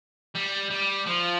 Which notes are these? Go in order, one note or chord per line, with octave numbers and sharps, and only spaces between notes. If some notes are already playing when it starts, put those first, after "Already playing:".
G3
G3
F3